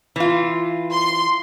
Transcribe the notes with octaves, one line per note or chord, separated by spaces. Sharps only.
E3 F4
C6